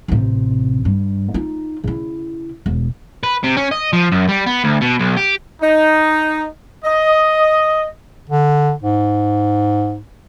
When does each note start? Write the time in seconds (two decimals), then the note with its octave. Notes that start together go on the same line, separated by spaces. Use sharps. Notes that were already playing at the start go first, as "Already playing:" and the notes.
0.08 A1 C3
0.85 G2
1.34 D#4 F4
1.84 C#3 E4
2.66 E1
3.23 B4
3.44 C3
3.57 C#4
3.71 D#5
3.93 F3
4.12 F#2
4.29 G3
4.46 B3
4.64 D2
4.81 B2
4.99 B1
5.17 G4
5.62 D#4
6.85 D#5
8.29 D3
8.82 G#2